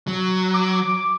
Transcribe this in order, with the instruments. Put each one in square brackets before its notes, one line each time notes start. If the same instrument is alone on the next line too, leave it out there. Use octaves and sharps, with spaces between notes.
[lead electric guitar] F#3
[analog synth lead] D6